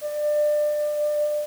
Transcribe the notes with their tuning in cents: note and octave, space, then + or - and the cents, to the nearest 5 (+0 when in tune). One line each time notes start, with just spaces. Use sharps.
D5 +25